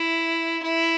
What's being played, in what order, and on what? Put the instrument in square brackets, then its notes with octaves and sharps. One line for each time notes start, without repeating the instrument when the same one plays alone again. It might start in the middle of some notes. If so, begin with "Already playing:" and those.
Already playing: [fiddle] E4
E4